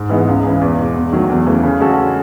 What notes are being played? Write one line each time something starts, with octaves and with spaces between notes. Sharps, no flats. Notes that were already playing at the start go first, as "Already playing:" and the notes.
Already playing: G#2
E3 G#3 B3 D#4
C#2
C#3 E3
E2
B2 G#3
E2
D#3 F#3 A3
E2
C#3 E3 A3
C#3
G#3 C#4 F#4 A4